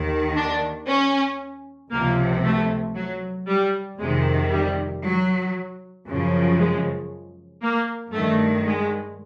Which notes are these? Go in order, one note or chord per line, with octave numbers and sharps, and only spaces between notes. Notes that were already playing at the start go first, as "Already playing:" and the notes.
Already playing: D#2 D#3
D4
C#4
C#2 C3 F3 A#3
A3
F#3
G3
F2 C3 D#3 G#3
G3
F#3
F#2 C#3 F3
G#3
A#3
G2 D#3 A3
G#3